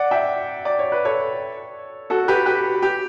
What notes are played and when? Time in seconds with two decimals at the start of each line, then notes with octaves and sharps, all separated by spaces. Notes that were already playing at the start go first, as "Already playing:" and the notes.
Already playing: D5 F#5
0.11 E5 G5
0.65 D5
0.79 C#5
0.92 B4
1.05 A4 C#5
2.10 F#4 A4
2.28 G4 B4
2.46 G4 B4
2.82 G4